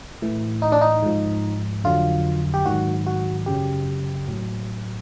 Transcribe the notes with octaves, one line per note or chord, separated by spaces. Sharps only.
A2 E3
D#4
D4
D#4
G#2 F3
F2 D3 F#3 F4
G4
G#2 D#3 F#3 F#4
F#4
F#2 C#3 F#3 G4
A2 F#3